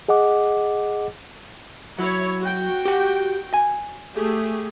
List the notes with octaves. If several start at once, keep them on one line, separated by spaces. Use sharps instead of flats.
G#4 D#5 F#5 D6
F#3 E4 C#5
F#4 G5
G4 F#5
G#5
A3 G4 G#4